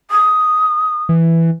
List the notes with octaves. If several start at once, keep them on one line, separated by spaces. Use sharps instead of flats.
D#6
E3